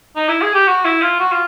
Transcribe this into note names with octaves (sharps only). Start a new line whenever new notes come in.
D#4
E4
G#4
G4
F#4
E4
F4
F#4
F4